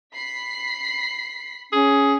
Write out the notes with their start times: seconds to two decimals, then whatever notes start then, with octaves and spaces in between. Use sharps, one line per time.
0.13 B5 B6 C7
1.73 C#4 G#4